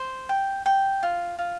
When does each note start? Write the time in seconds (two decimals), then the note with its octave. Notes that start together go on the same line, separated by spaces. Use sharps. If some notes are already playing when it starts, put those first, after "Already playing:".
Already playing: C5
0.29 G5
0.66 G5
1.03 F4
1.39 F4